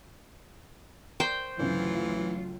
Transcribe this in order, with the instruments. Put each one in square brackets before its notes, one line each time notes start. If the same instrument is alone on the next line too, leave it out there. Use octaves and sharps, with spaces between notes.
[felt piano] A#4 D5 C#6 [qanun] C5 G5
[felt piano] G1 C#2 C#4 [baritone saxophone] E3 [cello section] F#3 A3 F4